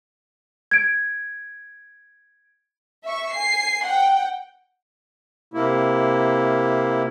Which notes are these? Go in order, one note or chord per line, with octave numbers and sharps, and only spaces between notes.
G#6 D7
E5 C#6
G#5 C7
F#5 G5
C3 A#3 E4